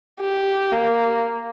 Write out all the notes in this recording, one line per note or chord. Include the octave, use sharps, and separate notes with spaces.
G4
A#3